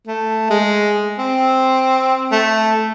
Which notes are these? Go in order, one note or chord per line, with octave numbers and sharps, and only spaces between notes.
A3
G#3
C4
A3